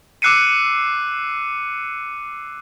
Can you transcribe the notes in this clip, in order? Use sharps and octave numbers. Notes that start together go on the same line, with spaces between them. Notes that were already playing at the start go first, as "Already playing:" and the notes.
D6 E6 F#6 C7 C#7 D#7